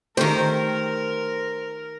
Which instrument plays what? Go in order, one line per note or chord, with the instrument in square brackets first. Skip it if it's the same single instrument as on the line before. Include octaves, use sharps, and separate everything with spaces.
[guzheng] D#3 G4 [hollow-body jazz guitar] A3 [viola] A#4 [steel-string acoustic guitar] C5